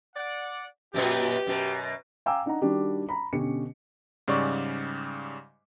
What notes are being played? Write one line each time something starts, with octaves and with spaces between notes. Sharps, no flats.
D5 F#5
F#2 A#2 B3 G4
F#2 B2
F5 G5 G#5 A#5 D6 E6
D4 D#4 D#5 F#5 A#5
D#3 G3 D4 F#4 G4
A#5 B5
B2 D3 C#4 G4 C#7
G#2 C#3 G3 D5 C#6